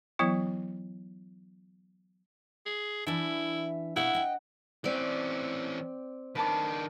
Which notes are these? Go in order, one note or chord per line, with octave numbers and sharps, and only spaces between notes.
E3 F#3 B3 E4
G#4
E3 D4 E4 E5
B2 E4 F5 F#5
D#5 G5
E3 C4 C#4 D5
D#3 D4 B4 A5 D6